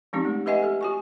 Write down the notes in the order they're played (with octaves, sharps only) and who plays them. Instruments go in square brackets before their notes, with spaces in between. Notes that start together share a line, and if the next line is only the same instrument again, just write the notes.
[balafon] F3 G#3 C4 C#4 D#4 G4
A3
G4 B4 D#5 E5 F#5 G#5
G4 A4
F#4 G#5 C#6